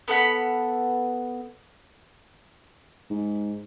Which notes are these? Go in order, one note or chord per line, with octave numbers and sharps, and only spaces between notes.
B3 A4 F#5 B5
G#2